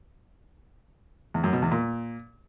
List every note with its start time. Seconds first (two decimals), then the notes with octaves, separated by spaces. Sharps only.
1.34 E2
1.44 F#2
1.53 B2
1.62 E2
1.72 A#2